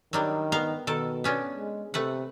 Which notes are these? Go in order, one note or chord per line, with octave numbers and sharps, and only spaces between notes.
D#3 F#3 G3 D4
B3 F5 A#5
B2 D#3 A4
B3 C#4 D4
G#3
C3 A3 B4 F#5